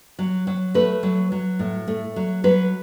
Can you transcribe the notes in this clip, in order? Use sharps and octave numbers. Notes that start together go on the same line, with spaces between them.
F#3
F#3
A3 B4
F#3
F#3
A2
A3
F#3
F#3 B4